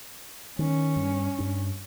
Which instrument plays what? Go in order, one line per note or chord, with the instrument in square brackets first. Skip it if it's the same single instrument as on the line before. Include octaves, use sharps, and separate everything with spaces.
[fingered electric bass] D#3 [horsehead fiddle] C#4
[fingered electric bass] G2
G2 D4